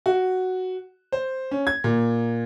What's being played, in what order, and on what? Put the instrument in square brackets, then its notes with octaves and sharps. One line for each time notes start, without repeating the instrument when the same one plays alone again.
[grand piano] F#4
C5
C#4
G#6
A#2